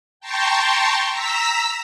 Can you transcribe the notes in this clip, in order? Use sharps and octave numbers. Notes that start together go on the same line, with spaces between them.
G5 A5 A#5 C6 C#6
A#5 E6 B6